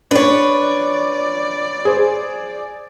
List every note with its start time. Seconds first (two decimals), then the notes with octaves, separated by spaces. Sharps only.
0.11 D4 B4 C#5 D5
1.85 G#4 C5